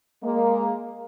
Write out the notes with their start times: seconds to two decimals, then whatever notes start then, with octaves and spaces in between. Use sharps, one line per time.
0.23 G#3 A#3